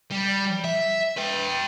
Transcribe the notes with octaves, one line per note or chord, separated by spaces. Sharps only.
G3
E5
B4 G5